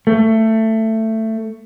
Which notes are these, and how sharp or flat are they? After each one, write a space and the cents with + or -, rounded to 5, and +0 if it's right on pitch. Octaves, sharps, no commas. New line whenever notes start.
A3 +15